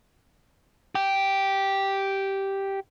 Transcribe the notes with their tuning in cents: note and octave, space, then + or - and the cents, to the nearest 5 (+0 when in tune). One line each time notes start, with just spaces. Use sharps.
G4 -5